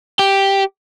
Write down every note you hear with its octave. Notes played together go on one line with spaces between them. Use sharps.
G4